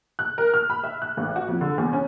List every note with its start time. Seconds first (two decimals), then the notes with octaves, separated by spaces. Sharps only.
0.19 F#6
0.38 A#4
0.54 F6
0.70 B5
0.84 E5
1.02 F#6
1.17 A1
1.36 F#4
1.48 F2
1.61 D3
1.78 E2
1.93 C#4